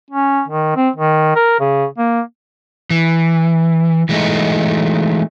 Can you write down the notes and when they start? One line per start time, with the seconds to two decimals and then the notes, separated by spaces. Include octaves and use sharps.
0.11 C#4
0.48 D#3
0.76 C4
0.96 D#3
1.36 A#4
1.60 C#3
1.98 A#3
2.90 E3
4.09 E3 G#3 A3 D#4